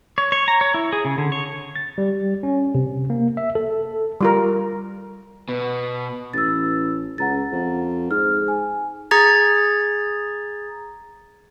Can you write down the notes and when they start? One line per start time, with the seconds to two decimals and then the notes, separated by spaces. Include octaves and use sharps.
0.18 C#5
0.32 C#5
0.48 A#5
0.61 C#5
0.74 E4
0.93 G#4
1.05 C#3
1.18 D3
1.32 C#5
1.76 A6
1.98 G3
2.43 C#4
2.75 C3
3.10 A#3
3.37 E5
3.55 A4
4.21 G3 F4 A#4
5.49 B2 B4
6.33 A1 E6 A6
7.18 C#2 F#5 A#5 A6
7.52 F2
8.11 G#2 F6
8.48 G#5
9.11 G#4 A#5 G#6 A6